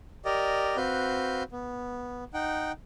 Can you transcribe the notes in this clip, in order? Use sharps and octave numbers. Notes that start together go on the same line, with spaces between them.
G4 A#4 D5 D#5
C4 F#4 B4 F5 G6
B3
D#4 F#5 G5